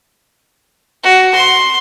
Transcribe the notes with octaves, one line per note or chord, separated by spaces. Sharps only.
F#4
C6